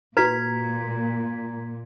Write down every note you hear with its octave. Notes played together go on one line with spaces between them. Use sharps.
A#2 F#4 B4 A#5 G#6 B6